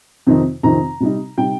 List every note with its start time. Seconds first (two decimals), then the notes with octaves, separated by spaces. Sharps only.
0.27 F2 C3 D#3 C4 D#4
0.63 F2 C3 D#3 C4 D#4 A#5
1.00 C3 G3 D#4
1.38 C3 G3 D#4 G5